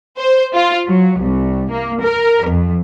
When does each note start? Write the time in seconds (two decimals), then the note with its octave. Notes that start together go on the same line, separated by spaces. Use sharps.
0.18 C5
0.55 F4
0.87 F#3
1.19 C2
1.71 A#3
2.01 A#4
2.46 F2